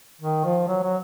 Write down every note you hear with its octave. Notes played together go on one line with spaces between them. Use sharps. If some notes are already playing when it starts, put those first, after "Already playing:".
D#3
F3
F#3
F#3